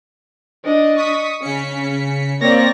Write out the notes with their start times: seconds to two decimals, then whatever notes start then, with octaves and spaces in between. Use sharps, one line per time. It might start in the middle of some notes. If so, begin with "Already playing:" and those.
0.64 D4 D#5
0.96 C#6 D#6 B6
1.41 C#3 C#4 B6 C#7
2.41 A#3 C4 C#5 D5 A#6